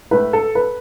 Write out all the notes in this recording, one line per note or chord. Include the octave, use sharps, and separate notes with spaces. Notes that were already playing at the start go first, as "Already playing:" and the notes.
A2 A3 E4 B4
A4
B4